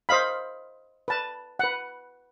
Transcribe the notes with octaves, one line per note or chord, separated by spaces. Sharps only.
C5 D#5 F5 B5
B4 A5
B4 F#5